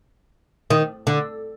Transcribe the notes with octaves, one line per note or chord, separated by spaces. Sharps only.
D#3
D3